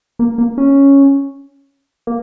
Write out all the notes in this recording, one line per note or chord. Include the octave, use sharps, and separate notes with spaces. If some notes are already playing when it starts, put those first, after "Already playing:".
A#3
A#3
C#4
A#3